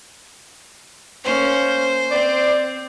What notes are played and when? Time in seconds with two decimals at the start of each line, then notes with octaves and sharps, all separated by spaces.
1.24 A#3 C#4 C5
2.11 C4 D5